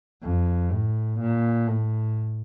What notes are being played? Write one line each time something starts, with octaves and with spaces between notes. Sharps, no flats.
F2
A2
A#2
A2